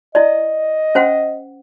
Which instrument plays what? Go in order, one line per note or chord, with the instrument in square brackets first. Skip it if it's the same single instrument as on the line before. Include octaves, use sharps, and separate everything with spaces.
[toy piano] E4 D5 [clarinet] D#5
[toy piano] C#4 C5 F#5